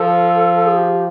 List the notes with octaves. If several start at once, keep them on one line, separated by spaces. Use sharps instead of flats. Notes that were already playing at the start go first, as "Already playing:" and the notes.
Already playing: F3 A4
G#4
G4